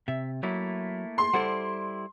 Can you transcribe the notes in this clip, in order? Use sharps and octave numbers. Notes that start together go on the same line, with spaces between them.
C3 E5
F#3 A3 A#3 E4
C6
G3 E4 A4 C5 D5 F#5